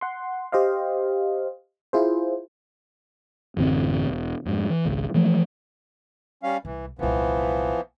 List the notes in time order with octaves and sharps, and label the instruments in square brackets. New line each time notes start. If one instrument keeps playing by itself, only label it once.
[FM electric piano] F#5 C6
G4 C5 D#5 F5
E4 F4 G#4 C5
[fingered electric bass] A1 F#2 D3 C4
E1
F2 G#2
E3
G#1 C#2
E3 F3 A3
[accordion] G3 C#4 F5
[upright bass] C2 [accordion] E3
[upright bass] D#1 C2 [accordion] E3 F3 B3